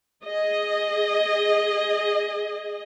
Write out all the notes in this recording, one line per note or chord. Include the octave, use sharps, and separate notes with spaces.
G#4 D#5